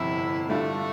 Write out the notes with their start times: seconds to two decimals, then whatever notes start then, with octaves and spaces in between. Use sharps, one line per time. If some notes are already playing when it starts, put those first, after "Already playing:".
Already playing: G1 F2 C3 E4
0.49 G2 D3 G3 A3 D4 F4